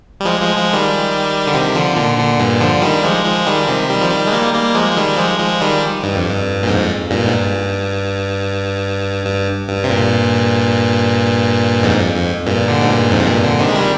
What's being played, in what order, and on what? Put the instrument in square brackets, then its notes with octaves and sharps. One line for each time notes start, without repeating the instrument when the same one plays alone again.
[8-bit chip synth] G3
F3 G#3
F3 G#3
F3 G#3
D#3 G3
D3
C3 D#3
D3 F3
A#2 D3
A#2 D3
G2 A#2
D3 F3
D#3 G3
F3 G#3
F3 G#3
D#3 G3
C3 D#3
D#3 G3
F3
D#3 G3
G#3
G3 A#3
G3 A#3
F3 G#3
G#3
D#3 G3
F3 G#3
F3 G#3
D#3 G3
G2
F2
G2
A#2
F2 G#2
G2 A#2
G#2
G2
G2
G2
C3
G2 A#2
F2 G#2
F2
F2
G2 A#2
A#2 D3
G#2
G2 A#2
F2 G#2
C3
G2 A#2
A#2 D3
C3 D#3
G#3
D#3 G3